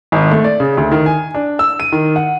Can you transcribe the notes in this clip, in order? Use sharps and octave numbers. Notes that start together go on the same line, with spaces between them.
G#1
A3
D5
C#3
D2
D#3
G#5
D4
E6
D#7
D#3
F#5